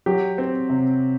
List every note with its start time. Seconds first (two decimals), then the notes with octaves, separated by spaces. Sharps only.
0.06 F#3 G4
0.38 C4
0.70 C3